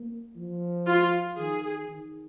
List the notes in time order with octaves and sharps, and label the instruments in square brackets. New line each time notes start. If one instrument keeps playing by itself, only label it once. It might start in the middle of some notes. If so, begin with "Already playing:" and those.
Already playing: [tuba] A#3
F3
[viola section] F4
[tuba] D#3 [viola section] G#4
[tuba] D#3